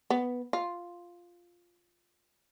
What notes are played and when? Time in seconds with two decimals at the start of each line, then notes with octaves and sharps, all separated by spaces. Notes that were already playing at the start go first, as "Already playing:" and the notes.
0.10 B3
0.53 F4